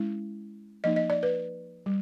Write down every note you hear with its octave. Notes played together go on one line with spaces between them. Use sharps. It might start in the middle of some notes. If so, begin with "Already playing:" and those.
Already playing: G#3 C#4 E4
F3 A#3 D#4 D#5
D#5
D5
B4
G3